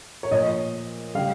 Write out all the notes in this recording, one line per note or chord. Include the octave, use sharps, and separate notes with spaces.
C#5
A#2 F3 D#5
C#3 G3 F5